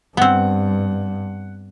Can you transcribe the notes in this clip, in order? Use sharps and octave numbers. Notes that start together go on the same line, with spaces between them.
G2 B3 C4 F#5